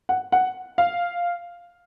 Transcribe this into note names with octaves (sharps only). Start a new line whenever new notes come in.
F#5
F#5
F5